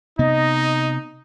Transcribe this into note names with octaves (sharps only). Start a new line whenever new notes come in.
C3 B3 D#4 D#5